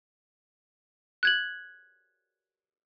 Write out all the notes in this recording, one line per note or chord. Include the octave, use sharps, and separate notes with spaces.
F#6 G#6 F#7